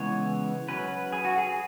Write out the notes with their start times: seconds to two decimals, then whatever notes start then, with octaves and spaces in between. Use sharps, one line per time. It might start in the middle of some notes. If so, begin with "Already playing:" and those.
Already playing: C#3 E3 G#3 B3 C#5
0.68 F#3 C#4 B4
1.12 G#4
1.25 F#4
1.38 G#4